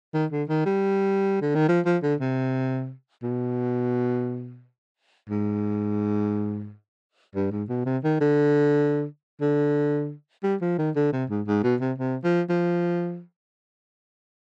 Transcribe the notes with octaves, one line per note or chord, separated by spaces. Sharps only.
D#3
D3
D#3
G3
D3
D#3
F3
F3
D3
C3
B2
G#2
G2
G#2
B2
C3
D#3
D3
D3
G3
F3
D#3
D3
C3
G#2
G#2
B2
C3
C3
F3
F3